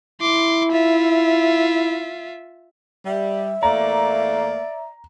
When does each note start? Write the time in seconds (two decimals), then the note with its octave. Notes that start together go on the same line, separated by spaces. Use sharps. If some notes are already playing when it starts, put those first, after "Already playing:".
0.21 E4 C6 D6
0.72 F4 E5
3.05 G3 E5
3.63 E2 A3 A#3 D5 A#5